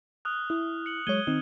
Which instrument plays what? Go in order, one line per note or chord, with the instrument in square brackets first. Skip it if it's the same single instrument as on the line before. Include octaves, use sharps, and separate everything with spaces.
[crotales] D#6 F6 F#6
[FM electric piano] E4 [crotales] D#6
[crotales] C#7 F#7
[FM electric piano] F#3 G#3 C#5 [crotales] G#6 D#7 G7
[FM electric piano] D#3 C4 D#4